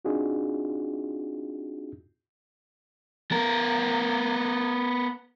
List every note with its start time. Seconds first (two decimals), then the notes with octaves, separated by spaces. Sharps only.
0.05 C4 D4 D#4 F4 F#4 G#4
3.31 B3 A#4